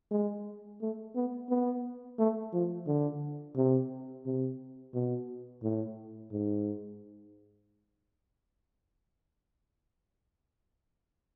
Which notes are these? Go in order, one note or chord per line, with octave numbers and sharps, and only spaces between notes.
G#3
A3
B3
B3
A3
F3
D3
C3
C3
B2
A2
G#2